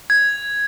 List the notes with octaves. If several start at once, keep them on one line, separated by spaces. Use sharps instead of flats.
G#6